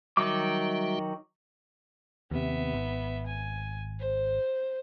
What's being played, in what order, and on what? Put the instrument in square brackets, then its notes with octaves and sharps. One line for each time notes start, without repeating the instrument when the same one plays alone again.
[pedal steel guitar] D#3 F#3 D6 [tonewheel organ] G3 F#4 E5
[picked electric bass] D#2 C3 [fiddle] B3 E5
[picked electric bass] G#1
[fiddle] G#5
C5